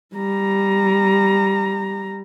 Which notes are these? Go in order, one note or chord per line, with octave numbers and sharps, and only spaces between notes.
G3 A#5